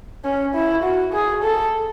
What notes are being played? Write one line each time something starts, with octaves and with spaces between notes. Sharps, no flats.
C#4
E4
F#4
G#4
A4